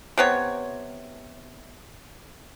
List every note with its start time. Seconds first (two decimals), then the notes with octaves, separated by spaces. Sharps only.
0.18 C3 B3 C#5